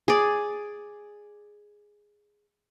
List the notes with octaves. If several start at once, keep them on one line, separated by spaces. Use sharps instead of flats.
G#4 D5